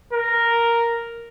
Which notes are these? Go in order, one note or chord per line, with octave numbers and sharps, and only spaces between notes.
A#4